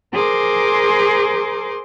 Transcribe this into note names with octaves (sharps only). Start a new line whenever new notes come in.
G#4 A#4 C5 C6 D6